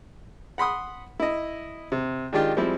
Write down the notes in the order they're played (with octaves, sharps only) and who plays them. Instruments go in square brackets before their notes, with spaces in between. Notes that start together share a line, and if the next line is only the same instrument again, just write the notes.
[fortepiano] F#5 B5 C6 D#6
E4 D#5
C3
D#3 G#3 D4 D#4 F4 G4
F3 G3 G#3 C4 E4